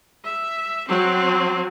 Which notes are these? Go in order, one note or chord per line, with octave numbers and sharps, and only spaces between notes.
E5
F#3 C4